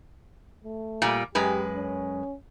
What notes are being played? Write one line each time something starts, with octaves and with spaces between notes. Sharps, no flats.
A3
A#2 G3
F#2 G#3 G4 B4
C#4